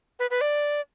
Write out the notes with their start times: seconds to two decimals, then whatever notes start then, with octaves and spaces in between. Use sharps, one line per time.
0.19 B4
0.30 B4
0.41 D5